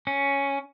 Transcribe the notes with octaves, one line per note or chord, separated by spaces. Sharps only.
C#4